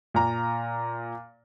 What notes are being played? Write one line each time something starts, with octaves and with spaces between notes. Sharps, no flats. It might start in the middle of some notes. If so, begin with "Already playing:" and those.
A#2 A#5